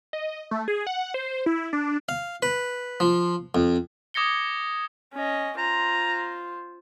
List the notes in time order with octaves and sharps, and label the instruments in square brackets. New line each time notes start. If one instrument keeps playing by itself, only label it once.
[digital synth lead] D#5
A3
G#4
F#5
C5
E4
D4
[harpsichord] F5
B4
F3
F2
[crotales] D6 D#6 G#6 A#6 C#7 G7
[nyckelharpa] C#4 D#5
[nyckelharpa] F4 C5 [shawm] A#5